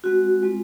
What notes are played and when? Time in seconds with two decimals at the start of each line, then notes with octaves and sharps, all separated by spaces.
0.04 G#3 C4 F#4
0.42 G#3 C4 F4